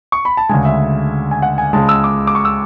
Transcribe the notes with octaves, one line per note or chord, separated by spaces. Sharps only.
C#6
B5
A5
D2 C#3 G#3 G#5
E5
G#5
F#5
G#5
C#2 C#3 G#3 A5
E6
D6
D6
C#6
E6